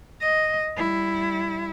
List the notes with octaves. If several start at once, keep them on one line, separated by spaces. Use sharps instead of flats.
D#5
G3 E4